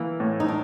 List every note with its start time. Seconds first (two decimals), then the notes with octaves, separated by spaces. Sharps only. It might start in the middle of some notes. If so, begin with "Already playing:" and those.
Already playing: E3 A#3
0.20 A2
0.40 D#4
0.48 D4